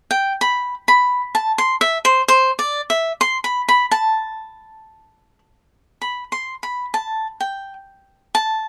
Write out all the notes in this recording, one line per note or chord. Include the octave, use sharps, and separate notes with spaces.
G5
B5
B5
A5
C6
E5
C5
C5
D5
E5
C6
B5
B5
A5
B5
C6
B5
A5
G5
A5